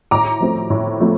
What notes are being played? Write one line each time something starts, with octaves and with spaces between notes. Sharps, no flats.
A2 A#5 D6
F3 A3 C4
A2
F3 A3 C4